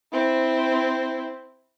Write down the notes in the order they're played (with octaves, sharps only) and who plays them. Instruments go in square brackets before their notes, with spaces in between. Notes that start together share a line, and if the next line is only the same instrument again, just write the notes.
[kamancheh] C4 E4